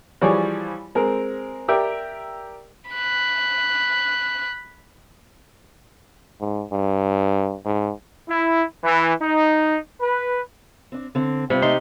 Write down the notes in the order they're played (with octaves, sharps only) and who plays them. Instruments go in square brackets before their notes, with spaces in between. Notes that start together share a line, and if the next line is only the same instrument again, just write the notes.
[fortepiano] E3 F3 G3 G#4 C#5 D5
G#3 C4 A#4
G4 A#4 D5 E5 G5
[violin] B5 F#6
[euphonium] G#2
G2
G#2
[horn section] E4
E3
D#4
B4
[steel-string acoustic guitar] C4 D4
D3 C4
[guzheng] C3 [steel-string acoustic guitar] G3 C4 F4
[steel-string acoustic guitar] A3 D5 E5 [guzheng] D#4 C6